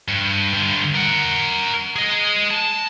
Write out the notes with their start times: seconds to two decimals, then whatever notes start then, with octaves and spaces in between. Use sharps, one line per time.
0.08 G2
0.54 G2 D3
0.95 A#4 F#5
1.96 G#4 D#5
2.51 A5